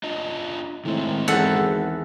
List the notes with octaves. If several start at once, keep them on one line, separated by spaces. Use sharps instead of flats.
D4 F4 D#5
A2 D#3 G#3 C4
G#1 E2 A4 F#5